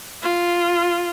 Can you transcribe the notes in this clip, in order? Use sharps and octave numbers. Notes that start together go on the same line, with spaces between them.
F4